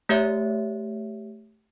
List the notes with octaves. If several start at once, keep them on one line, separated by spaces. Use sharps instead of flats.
A3 G4 C#5 E5